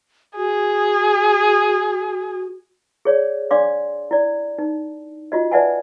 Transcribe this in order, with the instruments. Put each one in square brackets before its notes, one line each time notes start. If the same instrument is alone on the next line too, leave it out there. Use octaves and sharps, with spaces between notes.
[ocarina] F#4 [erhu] G#4
[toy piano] G#4 C#5 D5
D4 D5 F5 C6 D6
E4 D5
D#4
F4 F#4 D#5
B4 D5 E5 F#5 G#5 A5